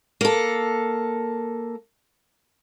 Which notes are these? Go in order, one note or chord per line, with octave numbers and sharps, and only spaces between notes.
A#3 A4